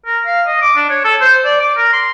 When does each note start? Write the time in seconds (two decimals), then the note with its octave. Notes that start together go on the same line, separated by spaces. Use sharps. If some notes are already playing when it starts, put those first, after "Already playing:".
0.06 A#4
0.26 F5
0.47 D#5
0.61 D6
0.76 D4
0.90 C#5
1.04 A4
1.22 C5
1.44 D5
1.61 D6
1.77 A#4
1.93 C6